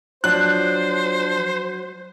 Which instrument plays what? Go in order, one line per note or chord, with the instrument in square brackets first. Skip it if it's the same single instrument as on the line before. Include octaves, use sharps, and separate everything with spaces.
[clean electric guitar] F3 D4 [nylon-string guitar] F#3 [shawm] C5 [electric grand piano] F#6